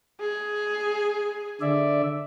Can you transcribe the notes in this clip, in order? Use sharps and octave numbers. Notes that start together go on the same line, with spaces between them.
G#4
D3 D5 E5